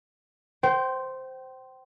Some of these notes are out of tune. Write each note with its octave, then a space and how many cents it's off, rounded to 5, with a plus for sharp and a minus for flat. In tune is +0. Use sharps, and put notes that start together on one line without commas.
C5 +0 G5 -30